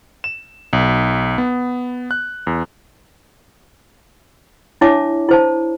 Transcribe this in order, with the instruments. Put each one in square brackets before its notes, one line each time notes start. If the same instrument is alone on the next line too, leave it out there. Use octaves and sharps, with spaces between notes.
[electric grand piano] E7
B1
B3
F#6
E2
[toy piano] D4 E4 C#5 E5 A5 D6
E4 C5 A5